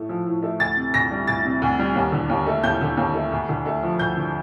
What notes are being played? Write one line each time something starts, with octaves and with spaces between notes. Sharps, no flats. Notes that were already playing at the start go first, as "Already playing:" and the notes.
Already playing: A2 A3
F3
A2
A3
D2 A6
C3
D2 A#6
G3
D2 A6
C3
D2
G3
D#2
D3
D#2
A3
D#2 G6
D3
D#2
A3
D2
D3
A3
F3
D2 G6
D3